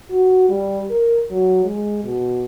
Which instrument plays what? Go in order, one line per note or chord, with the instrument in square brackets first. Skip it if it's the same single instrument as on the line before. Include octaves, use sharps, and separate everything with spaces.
[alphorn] F#4
G3
A#4
F#3
G#3
B2